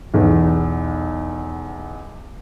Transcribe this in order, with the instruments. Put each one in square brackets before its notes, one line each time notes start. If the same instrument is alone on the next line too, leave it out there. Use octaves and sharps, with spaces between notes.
[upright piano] B1 E2